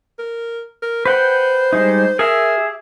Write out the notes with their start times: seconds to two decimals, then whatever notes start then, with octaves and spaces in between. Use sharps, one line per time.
0.19 A#4
0.82 A#4
1.06 B4 C5 F#5 G5
1.73 G3 G#3 D#4
2.19 G#4 A#4 E5
2.57 G4